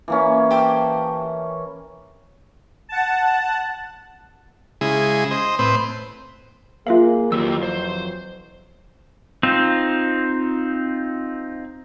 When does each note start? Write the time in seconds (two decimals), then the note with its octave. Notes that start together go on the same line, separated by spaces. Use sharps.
0.08 E3 A#3 C#4
0.51 G4 A4 C5
2.89 F#5 A5
4.81 C#3 G#3 E4 G#4
5.31 C5 D#5
5.59 A2 C4 B4 C5
6.87 A#3 F4 G#4 E5 F5
7.32 F2 D#3 E3 F#3 A#3 G4 E6
7.63 C5
9.43 C4 D#4 F4